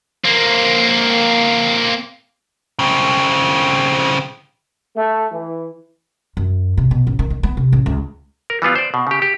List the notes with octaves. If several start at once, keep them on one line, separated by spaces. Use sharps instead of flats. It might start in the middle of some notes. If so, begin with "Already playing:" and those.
A#3 C4
C#3 C4
A3
E3
F#2
C3
B2
A1
D#3
D#3
B3
C3
A1
C#2
A#4
E3 G3 B3 F4
C5 D5
B2
C#3 G4
G4